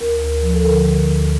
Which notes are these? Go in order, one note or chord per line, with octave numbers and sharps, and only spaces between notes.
D2 A#4
D2
F3
A4
D3 A#4
D2
D2